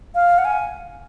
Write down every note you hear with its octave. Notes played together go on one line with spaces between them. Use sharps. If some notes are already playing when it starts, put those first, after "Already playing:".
F5
F#5
G#5